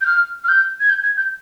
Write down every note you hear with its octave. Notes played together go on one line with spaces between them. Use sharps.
G6
F6
F6
G6
G#6
G6
G#6
G6